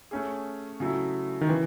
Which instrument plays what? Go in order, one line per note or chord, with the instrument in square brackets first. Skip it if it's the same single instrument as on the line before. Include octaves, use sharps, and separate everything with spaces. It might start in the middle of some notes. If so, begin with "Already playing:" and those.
[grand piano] A3 C#4 G#4
C#3 F#3 A3 E4
[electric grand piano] D#3
[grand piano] C#3 [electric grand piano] E3